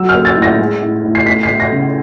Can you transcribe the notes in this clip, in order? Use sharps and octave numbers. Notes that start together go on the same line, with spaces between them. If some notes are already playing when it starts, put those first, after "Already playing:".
Already playing: F#3 E6
F6
A#3
A6
A2
A#6
G#3
A2
A2
C7
A3 B6
C7
A3
A#6
C#3